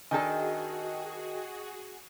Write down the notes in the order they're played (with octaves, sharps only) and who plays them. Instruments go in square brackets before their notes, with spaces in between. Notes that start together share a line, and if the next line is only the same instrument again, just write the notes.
[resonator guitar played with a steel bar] D#3 D4 A4 [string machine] F#4 G#4 [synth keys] D#5 G5 [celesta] G#5